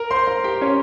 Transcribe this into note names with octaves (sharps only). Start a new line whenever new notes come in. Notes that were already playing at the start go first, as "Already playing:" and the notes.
Already playing: A#4 A#5
C5 C6
A#4 A#5
G4 G5
C#4 C#5